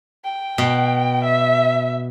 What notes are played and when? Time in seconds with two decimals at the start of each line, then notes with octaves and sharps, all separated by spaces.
0.24 G5
0.58 B2
1.23 E5